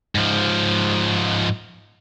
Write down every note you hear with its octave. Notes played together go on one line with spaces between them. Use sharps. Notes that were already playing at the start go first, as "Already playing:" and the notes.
G#2 F3